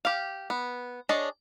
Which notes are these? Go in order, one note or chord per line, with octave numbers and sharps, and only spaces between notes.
G4 F5
B3
D4 G#4 C#5 D#5 A5